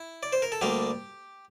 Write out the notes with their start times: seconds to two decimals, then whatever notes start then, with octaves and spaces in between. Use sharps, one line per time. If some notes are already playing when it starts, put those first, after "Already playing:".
Already playing: E4
0.23 D5
0.33 C5
0.42 A#4
0.52 A4
0.61 D2 D3 G3 A#3 G4